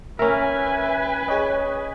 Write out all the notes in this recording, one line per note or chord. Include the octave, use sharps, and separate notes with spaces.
C#4 A#4 B4 E5 G#5
G#4 C#5 D#5